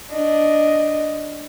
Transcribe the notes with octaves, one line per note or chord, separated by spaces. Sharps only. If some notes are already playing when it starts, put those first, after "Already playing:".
D4 D#5